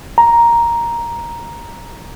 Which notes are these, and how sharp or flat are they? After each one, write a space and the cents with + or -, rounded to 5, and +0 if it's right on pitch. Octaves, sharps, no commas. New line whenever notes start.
A#5 +5